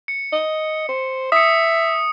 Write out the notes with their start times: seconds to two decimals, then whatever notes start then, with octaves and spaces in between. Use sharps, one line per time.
0.08 C#7
0.33 D#5
0.88 C5
1.32 E5 D#6 C#7